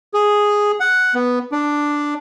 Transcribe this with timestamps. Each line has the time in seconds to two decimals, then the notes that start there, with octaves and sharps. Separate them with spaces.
0.14 G#4
0.80 F#5
1.14 B3
1.52 D4